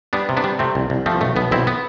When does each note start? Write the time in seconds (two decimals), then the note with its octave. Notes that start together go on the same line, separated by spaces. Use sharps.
0.13 G3 B3 D4
0.29 C3
0.37 B3 D4
0.44 G3
0.59 C3 A3 C4
0.75 C2
0.90 C2
1.06 F3 A3 C4
1.21 B1 A3
1.36 B1 B3
1.51 B1 C4 E4
1.67 B3